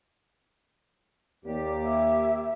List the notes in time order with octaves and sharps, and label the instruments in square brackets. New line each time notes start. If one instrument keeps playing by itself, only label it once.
[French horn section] D#2 A#3 [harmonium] G4 [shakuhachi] D5
[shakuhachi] E5